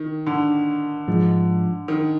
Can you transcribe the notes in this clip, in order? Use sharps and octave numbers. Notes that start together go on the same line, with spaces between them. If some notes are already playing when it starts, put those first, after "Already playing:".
Already playing: D#3
D3
G#2 F3 G#3
D#3